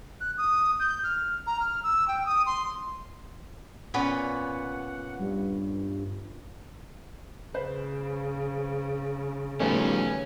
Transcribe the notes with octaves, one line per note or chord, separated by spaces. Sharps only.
F#6
D#6
G6
F6
A#5
F6
E6
G5
D#6
C6
A#2 B3 C#4 F#5
G2
C#3 B4 C5
D#3 F3 G3 A3 B3 C#4